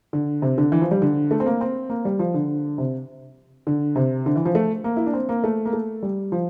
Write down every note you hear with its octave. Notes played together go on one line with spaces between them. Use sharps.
D3
C3
D3
E3
F3
G3
D3
A3
C4
A#3
C4
A#3
G3
F3
D3
C3
D3
C3
D3
E3
F3
A3
A#3
E4
D4
C4
A#3
A3
A#3
A3
G3
F3